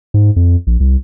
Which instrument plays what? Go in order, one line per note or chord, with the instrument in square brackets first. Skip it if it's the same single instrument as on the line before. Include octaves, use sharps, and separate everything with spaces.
[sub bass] G#2
F2
A#1
C2